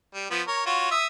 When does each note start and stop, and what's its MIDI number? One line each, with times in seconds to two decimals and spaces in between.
0.14 0.29 55
0.31 0.42 53
0.31 0.42 59
0.47 0.66 70
0.47 0.66 73
0.66 0.91 65
0.66 0.91 66
0.66 0.91 73
0.91 1.07 76
0.91 1.07 87